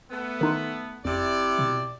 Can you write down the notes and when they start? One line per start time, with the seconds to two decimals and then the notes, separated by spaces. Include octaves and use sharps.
0.10 A3 B3
0.41 D#3 D#4 C6
1.05 F1 F2 C3 E4 D5
1.59 B2